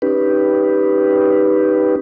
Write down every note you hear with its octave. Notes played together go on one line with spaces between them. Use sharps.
C#4 D#4 G4 B4